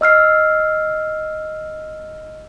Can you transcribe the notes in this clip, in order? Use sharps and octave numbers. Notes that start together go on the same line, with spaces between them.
D#5 E6 F6 C7